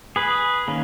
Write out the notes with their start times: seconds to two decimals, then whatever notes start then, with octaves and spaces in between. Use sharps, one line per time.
0.16 G#4 B4
0.68 D#3 A#3 C#4